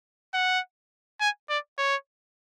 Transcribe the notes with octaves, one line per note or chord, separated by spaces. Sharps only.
F#5
G#5
D5
C#5